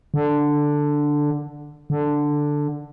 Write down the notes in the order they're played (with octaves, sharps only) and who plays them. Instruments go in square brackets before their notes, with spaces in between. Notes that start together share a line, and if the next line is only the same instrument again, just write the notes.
[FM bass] D3
D3